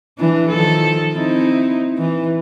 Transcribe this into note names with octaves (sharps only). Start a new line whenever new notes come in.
E3 D4
D#3 F3 A4
C4 D#4 E4
E3